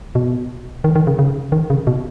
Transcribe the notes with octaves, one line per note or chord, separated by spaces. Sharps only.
B2
D#3
D#3
C#3
C#3
D#3
C#3
B2